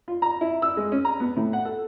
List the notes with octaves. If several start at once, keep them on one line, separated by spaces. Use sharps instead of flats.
F4
A#5
E4
E6
G#3
C#4
A#5
B3
A2
F#5
A4